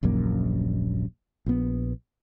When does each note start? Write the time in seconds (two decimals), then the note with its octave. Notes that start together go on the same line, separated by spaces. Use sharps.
0.03 D#1 A#1 F#2 A#3
1.46 A#1 B3